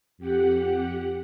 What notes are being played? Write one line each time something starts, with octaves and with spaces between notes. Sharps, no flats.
F2 G4 F#5